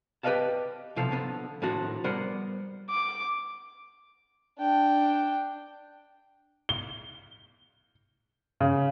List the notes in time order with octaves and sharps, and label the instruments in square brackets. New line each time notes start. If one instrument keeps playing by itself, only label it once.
[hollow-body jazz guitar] G4 B4 D5 D#5 F5 A5
B1 C3 F3 A4 F5
D3 F3 B3
A2 D#3 F3 D4 F#4
G3 B3 A#4 C5 D5 F#5
[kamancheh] D6
[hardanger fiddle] D4 G5
[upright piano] G7
C#3